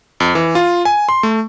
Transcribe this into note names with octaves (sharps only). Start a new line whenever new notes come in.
F2
E3
F4
G#5
C6
A3